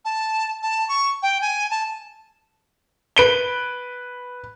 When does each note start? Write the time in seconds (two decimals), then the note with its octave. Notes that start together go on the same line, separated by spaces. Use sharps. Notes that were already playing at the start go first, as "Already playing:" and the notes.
0.05 A5
0.63 A5
0.89 C#6
1.23 G5
1.41 G#5
1.70 A5
3.16 B4 D7 G7